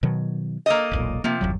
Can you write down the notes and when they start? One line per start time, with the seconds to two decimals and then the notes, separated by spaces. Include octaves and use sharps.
0.03 B2 D#3 F#3
0.66 A#3 A4 D#5
0.91 E1 B1 A#2
1.24 C3 F3 A#3
1.41 G1 E2 F#3